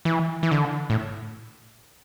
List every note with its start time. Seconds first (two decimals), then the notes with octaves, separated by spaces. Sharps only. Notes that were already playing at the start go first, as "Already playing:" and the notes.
0.05 E3
0.43 E3
0.51 D3
0.90 A2